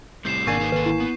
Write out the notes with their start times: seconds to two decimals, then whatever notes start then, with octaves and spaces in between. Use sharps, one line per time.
0.25 A2 C3 G3 G6 C7 E7
0.47 G#1 B2 A#3 D4 G#5 C#6
0.60 D#4 G#4 B4
0.72 D#3 A4 B4
0.86 E4
1.00 B3